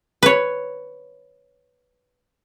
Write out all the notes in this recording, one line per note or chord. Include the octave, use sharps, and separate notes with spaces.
B4 C#5